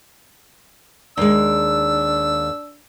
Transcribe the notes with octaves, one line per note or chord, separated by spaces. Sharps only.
D#2 G#3 D4 E6